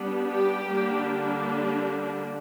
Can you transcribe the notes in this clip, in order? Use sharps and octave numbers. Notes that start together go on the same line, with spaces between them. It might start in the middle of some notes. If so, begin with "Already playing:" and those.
Already playing: G3 B3 D4
G4
D3 G3 A#3 D4